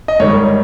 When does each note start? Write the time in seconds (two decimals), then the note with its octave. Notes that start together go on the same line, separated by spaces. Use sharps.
0.08 D#5
0.20 G#2 D#3 G3 C#5